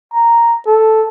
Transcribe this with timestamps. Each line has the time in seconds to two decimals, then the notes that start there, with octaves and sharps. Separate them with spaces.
0.14 A#5
0.66 A4